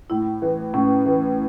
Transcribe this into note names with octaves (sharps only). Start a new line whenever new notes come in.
A2 E4
E3
A2 C#4
E3